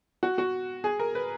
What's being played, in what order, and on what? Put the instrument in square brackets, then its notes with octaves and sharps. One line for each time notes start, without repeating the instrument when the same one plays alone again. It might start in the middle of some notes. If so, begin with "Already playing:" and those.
[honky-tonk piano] F#4
F#4
G#4
A#4
B4